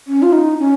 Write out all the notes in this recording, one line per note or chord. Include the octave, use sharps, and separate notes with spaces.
C#4
F4
D#4
C#4